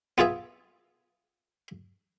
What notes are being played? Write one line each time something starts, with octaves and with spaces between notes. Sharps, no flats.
B3 F4 G#4 E5